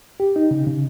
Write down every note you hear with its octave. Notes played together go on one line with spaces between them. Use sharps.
G4
D#4
C#3
C#3